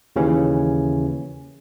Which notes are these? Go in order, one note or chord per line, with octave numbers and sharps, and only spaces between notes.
D#2 C#3 E3 C#4